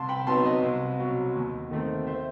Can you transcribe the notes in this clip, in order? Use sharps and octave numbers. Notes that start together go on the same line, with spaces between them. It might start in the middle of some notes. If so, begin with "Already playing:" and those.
Already playing: C2 A5 C6
G5 B5
C3 F#3 B3 D#4 A5 C6
B4 D#5
C2
B2 F#3
D#2
D#3 A3 C4
C5 E5